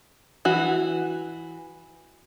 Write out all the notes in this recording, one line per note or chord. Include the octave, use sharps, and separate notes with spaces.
E3 F#4